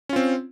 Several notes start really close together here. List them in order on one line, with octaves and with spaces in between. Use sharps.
C#4 F4 C4